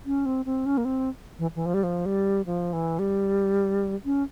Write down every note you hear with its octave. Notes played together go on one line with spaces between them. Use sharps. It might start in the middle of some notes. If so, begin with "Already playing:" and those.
C#4
C4
C4
C#4
A#3
C4
E3
E3
F3
G3
F3
G3
F3
E3
G3
C#4